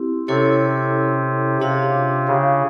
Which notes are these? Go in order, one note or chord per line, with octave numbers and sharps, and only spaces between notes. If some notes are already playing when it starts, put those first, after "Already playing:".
Already playing: C4 E4 G4
C3 C#4 E4 A4 C#5
C3 D4 F4 G#4 C#5 F5
C#3